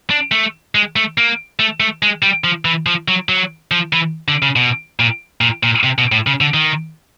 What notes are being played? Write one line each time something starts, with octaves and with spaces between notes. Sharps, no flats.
D4
A3
G#3
A3
A#3
A3
A3
G#3
G3
F3
E3
F3
F#3
F#3
F3
E3
D3
C#3
B2
A#2
A#2
A#2
C3
B2
A2
C#3
D3
D#3